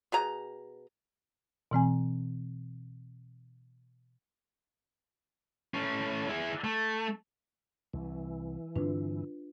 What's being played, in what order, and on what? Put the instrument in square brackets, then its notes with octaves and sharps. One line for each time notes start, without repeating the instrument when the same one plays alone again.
[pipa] B2 G#4 A#5
[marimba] B2 E3 C4 G#5
[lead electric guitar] A2 C#4
E4 G#4
A3
[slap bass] C2 [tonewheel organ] E3
[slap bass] G2 D3 C4 [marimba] D4 F4 B4